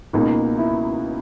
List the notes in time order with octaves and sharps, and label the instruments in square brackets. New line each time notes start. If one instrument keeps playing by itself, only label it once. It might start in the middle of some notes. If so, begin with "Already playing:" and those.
[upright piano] C#2 B2 A#3 [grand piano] D#4
[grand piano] E4